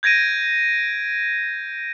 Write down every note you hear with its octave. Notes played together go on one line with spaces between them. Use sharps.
G6 G#6 A#6 D7 D#7